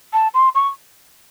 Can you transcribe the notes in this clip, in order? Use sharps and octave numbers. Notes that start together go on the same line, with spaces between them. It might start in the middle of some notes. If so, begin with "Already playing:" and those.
A5
C6
C#6